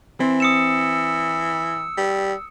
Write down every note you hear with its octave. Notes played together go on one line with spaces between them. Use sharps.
E3 C4
D#6 E6 C#7 E7
G3